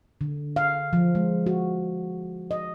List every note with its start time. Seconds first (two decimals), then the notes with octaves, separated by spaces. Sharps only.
0.21 D3
0.56 F5
0.93 F3
1.15 G#3
1.46 F#4
2.51 D#5